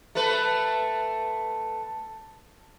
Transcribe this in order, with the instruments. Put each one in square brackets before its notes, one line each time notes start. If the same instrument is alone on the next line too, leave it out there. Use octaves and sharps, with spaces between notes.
[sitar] A3 B4